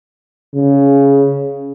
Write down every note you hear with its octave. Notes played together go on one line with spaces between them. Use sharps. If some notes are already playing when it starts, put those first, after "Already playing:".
C#3